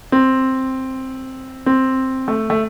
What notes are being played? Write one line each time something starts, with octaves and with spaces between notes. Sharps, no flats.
C4
C4
A3
A3